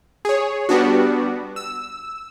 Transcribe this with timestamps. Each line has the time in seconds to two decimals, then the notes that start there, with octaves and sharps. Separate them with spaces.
0.25 G#4 C#5
0.69 G3 B3 D4 F#4
1.56 E6